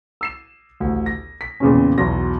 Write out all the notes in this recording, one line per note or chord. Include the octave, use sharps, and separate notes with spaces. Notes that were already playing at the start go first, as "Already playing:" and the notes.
E6 C7 E7
A1 D2
A#6
B6
E2 A#2 C#3 C4 C#4
B1 E2 F#3 C6 A#6